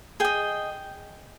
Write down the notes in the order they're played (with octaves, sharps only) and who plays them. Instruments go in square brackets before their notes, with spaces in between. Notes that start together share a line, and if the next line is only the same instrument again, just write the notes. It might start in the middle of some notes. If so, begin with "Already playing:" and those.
[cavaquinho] G#4 D#5 G5